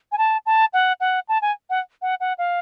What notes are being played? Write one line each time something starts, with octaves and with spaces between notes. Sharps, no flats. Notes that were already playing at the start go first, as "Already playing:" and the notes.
G#5
A5
A5
F#5
F#5
A5
G#5
F#5
F#5
F#5
F5